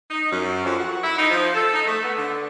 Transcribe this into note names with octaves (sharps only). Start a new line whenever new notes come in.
D#4
F#2
F2
F#4
E4
D#4
F3
A4
D#4
A3
B3
D3